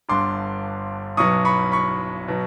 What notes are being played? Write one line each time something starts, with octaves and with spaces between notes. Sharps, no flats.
G1 G2 D3 C6 D6
B1 B2 F#3 C#6 D#6
B5 C#6
B5 C#6
B2 F#3